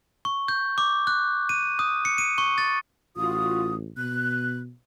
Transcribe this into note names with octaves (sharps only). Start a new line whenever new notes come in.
C#6
G6
D6
F#6
D#7
D#6
C#7
D#7
C#6
A6
A1 F4 F#4 D#6
B2 F#6